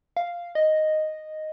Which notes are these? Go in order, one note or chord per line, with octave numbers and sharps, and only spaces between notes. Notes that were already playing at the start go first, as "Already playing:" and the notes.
F5
D#5